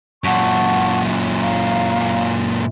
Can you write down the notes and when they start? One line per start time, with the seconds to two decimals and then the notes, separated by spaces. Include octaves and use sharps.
0.24 F#2 A#2 F#5 A5 C#6
1.40 F5 A#5